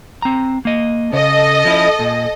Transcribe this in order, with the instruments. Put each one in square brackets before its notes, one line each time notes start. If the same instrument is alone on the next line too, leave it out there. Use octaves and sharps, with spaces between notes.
[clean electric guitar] C4 A#5
A#3 D#5
[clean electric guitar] C#3 [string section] A4 D#5
[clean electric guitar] F3 C#4 E4
A#2